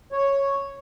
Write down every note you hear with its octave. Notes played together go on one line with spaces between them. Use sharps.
C#5